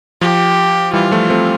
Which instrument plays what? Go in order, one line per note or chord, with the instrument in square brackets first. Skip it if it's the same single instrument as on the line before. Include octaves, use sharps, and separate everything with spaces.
[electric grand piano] F3 [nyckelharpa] G4
[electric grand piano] E3 G3 [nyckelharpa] F4
[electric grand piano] F3 A3
A3 C4